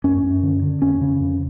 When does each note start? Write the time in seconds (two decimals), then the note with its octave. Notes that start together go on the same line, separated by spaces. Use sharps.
0.04 F#2 C#4
0.23 F#2
0.43 D3
0.62 D3
0.82 F2 C#4
1.01 C#3
1.20 F2